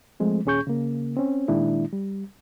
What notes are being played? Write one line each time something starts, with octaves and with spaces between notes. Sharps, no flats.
F3 G#3 A3 C4
D#2 A#2 C#4 G#4 C#6 G6
C#3 A#3
C4 C#4
A#2 D#3 G#3 D4 E4
G3